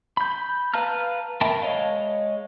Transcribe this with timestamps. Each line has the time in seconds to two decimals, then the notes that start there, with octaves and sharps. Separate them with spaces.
0.17 B5 G6
0.74 B4 F5 A5 A#5 F6
1.41 A#4 E5 G5 A5 B5
1.62 G#3 C#5 D#5 F5